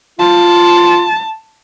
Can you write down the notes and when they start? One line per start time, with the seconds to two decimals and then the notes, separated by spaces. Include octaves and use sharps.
0.19 F4 A5